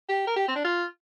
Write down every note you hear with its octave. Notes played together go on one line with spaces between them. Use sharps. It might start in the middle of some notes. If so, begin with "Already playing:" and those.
G4
A#4
G4
C4
D4
F4